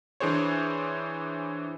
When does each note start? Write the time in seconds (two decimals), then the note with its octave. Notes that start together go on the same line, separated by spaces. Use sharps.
0.20 E3 D4 G#4 C5 C#5